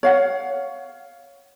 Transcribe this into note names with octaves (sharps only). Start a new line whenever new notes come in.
C#5 F5 F#5